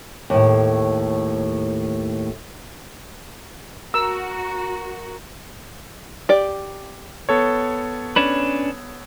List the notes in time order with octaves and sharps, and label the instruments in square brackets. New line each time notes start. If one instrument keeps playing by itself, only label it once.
[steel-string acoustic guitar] D#2 A2
[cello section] F#4 [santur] A#4 [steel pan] E6
[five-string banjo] G4 D5
[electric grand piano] B3 A4 C#5
[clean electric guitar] C#4 D4 B4